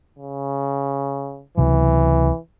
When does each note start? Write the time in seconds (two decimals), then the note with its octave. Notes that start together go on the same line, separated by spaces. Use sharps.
0.19 C#3
1.58 C#2 C3 E3 F#3